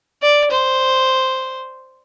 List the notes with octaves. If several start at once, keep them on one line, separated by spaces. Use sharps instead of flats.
D5
C5